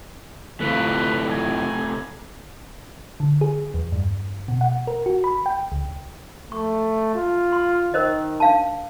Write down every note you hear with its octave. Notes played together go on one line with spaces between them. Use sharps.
F#2 C3 E3 A3 F4 B4
G#5
D3
G#4
E2
G2
B2
F#5
A#4
F#4
B5
G5
C#2
A3 C#6
F4
C6
D#3 A#4 C5 D#5
D4 F5 A5